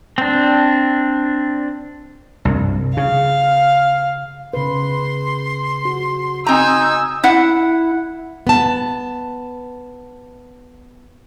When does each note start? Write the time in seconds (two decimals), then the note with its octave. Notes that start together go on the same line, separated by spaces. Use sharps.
0.18 C4 D4
2.45 C2 G2
2.97 C#3 F5
4.53 C#3 B4 C6
5.85 F#4
6.47 C4 D#4 G#5 A#5 D#6 E6 G6
7.24 E4 F#5
8.47 B3 A5